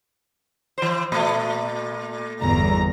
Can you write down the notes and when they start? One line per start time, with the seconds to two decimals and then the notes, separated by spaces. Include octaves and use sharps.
0.78 E3 C5
1.12 A#2 A3
2.41 G1 E2 A#5